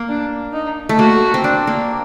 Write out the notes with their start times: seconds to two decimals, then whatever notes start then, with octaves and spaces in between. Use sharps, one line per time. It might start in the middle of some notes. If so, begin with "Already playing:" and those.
Already playing: A#3
0.08 D4
0.53 D#4
0.89 A3
0.99 A#3 F#4
1.34 C4
1.44 D4
1.67 A#3